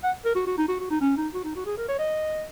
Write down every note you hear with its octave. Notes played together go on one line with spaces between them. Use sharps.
F#5
A#4
F#4
F#4
D#4
F#4
F#4
D#4
C#4
D#4
F#4
D#4
F#4
G#4
A#4
C#5
D#5